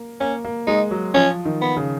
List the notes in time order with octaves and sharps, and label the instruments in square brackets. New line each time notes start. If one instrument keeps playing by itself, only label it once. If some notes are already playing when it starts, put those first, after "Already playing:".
Already playing: [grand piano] A#3
[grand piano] A#3 [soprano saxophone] C#4
[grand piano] A#3
[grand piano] G#3 [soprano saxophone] D#4
[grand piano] F#3
[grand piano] F3 [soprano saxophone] C#4
[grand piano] D#3
[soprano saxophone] B3
[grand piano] C#3